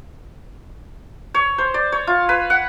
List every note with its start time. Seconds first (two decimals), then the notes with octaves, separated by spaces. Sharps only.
1.34 C#5
1.58 C5
1.74 D5
1.92 C#5
2.07 F4
2.29 B4
2.50 F#5